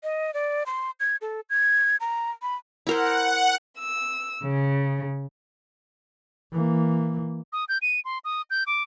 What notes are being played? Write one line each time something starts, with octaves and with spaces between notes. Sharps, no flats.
D#5
D5
C6
G#6
A4
G#6
A#5
B5
E4 A#4 C5 F#5
E6
C#3
E3 A#3
D#6
G6
D#7
C6
D#6
G6
D6